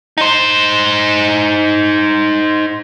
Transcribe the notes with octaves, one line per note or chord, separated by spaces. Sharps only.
D#4 C5